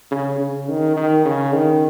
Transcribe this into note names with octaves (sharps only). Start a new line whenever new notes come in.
C#3
C#3
D#3
D#3
C#3
D#3